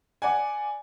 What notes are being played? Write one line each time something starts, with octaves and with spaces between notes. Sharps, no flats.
D5 F#5 G#5